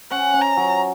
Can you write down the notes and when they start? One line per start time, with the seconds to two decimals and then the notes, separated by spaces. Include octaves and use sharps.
0.11 C#4 F#5
0.34 C#4
0.41 A#5
0.57 F#3